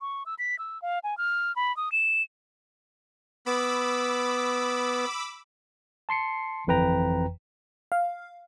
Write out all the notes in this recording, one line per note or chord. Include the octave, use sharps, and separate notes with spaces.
C#6
E6
B6
E6
F5
G#5
F6
B5
D#6
E7
B3 B5 D6 E6
A5 C6 C7 C#7
G1 F2 E3 B4 G5 A#5
F5